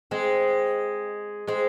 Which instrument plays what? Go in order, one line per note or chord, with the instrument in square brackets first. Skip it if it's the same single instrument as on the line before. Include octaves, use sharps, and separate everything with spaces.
[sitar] G#3 [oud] C4
[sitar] G#3 [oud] C4